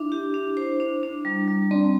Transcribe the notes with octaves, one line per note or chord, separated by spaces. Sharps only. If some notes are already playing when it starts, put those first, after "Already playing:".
Already playing: D4 E4
G4
D4
C5
D4
D4
G3
G3
C4 D4